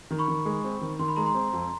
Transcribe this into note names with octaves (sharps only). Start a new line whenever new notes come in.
D#3
B5 C#6
D#3
G#3
C4
D#3
D#3 C6
B5
G#3 A#5 C6
A#5 C6
C4
F2